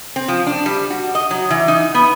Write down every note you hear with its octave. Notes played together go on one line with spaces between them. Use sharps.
C4
F3
D4
G3
F#4
D#5
F#3
E3
D#4
B3